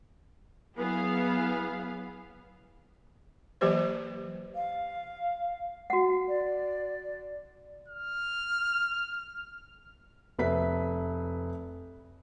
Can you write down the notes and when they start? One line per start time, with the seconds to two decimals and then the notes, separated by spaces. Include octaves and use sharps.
0.76 F#3 B3 E4 G#4 F5
3.61 E3 F#3 A#3 G4 B4 C5
4.55 F5
5.90 F#4 F#5
6.28 D5
7.88 F6
10.39 F1 B4 E5 B6